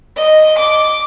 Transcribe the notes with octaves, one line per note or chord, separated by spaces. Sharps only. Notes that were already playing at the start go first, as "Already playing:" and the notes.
D#5
D6